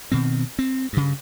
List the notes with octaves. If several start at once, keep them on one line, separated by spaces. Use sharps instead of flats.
B2 D#3 C4
C4
G2 C#3